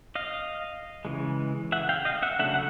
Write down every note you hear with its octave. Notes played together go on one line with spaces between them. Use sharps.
D#5 F5
C#3 E3 G#3
E5 F#5
F5 G5
D#5 F5
E5 F#5
C#3 F#3 A3 D4 E5 F#5
F#5